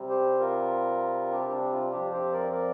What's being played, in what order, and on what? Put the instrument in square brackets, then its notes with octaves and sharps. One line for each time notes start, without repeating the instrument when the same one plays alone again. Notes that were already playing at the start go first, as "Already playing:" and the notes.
Already playing: [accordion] C3 G3 C4
G4 C5
F4 A#4
D4 G4
D4
F4
F2 F3 C4 D4 G4
G4 C5
A#4 D5
A#4 D5